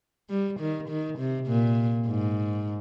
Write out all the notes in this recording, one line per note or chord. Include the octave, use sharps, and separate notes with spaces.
G3
D#3
D#3
C3
A#2
G#2